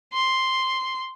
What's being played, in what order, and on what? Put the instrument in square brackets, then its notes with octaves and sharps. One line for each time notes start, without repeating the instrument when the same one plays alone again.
[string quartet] C6